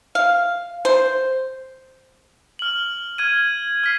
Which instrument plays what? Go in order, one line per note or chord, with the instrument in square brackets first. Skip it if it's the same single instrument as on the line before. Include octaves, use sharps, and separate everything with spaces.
[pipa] F5
C5
[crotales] F6 F#7
F6 G#6 D#7
F6 B6 C7